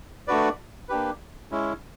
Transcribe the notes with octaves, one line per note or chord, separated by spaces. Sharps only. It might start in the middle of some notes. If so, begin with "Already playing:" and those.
A3 D4 F#4 B4 D5
A#3 D4 G4 B4
G#3 C#4 E4